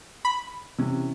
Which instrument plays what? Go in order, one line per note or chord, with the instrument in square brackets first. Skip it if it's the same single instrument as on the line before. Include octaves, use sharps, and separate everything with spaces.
[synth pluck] B5
[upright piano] C3 [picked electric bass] E3 C#4